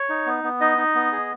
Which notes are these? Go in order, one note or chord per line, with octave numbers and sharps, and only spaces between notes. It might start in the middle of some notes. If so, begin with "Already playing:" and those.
Already playing: C#5
D#4
B3
B3
D#4 D#5
D#4
B3
G#4